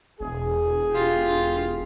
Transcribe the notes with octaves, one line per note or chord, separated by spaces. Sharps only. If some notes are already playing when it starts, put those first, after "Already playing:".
E1 G#4
F4 G4